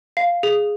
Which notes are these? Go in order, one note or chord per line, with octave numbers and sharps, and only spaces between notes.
F5
G#4